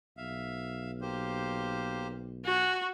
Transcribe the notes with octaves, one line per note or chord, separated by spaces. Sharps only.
B1 E5 F5
A#3 G4 C5
F#4 G#5